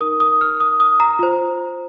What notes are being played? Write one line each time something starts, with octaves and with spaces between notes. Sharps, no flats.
D#4 A#4 D#6
D#6
F6
D#6
D#6
A#5
F4 C5